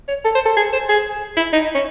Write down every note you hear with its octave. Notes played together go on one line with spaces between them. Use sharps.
C#5
A4
C5
A4
G#4
C5
G#4
E4
D#4
C#4